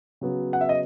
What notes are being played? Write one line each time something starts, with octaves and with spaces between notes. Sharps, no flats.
C#3 F#3 B3
F#5
E5
D#5